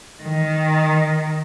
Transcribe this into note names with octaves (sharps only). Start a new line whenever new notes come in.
D#3